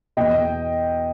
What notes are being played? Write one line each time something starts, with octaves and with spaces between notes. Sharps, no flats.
E2 B2 D#5 G5